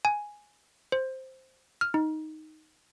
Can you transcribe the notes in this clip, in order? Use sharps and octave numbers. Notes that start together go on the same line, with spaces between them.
G#5
C5
F6
D#4